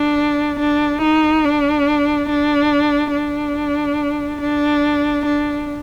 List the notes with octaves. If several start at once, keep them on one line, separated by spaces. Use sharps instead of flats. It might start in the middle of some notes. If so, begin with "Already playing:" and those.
Already playing: D4
D4
D#4
D4
D4
D4
D4
D4